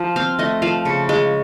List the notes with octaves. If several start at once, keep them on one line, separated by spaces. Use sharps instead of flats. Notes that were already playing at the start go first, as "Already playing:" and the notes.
Already playing: F3
C4 F5
A3 D#5
F3 F5
C#3
G#3